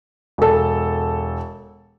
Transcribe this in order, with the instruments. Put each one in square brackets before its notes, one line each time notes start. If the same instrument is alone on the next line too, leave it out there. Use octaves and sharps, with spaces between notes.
[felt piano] E1 A4